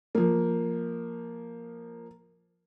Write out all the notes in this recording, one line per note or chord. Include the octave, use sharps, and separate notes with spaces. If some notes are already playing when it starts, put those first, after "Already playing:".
F3 A#3